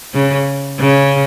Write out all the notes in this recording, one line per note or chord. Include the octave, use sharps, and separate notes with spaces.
C#3
C#3